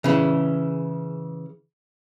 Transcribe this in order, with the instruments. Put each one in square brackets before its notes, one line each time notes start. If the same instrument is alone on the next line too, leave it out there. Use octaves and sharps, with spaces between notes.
[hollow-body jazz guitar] C#3 E3